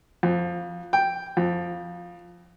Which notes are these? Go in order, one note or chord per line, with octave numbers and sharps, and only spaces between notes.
F2
G5
F2